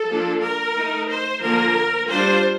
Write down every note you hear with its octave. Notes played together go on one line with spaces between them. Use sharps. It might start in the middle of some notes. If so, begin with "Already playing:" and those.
Already playing: A4
F3 A#3 D4 F4
A#4
A3 D#4
C5
D3 F3 A#3 A#4
G3 D4 F4 C5